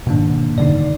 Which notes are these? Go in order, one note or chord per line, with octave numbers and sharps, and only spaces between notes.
G#2 B2 D#3 A#3 D4
E1 F#2 D3 D#4 D5